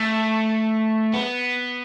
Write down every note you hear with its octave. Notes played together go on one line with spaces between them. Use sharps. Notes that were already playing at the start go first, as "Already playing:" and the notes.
Already playing: A3
B3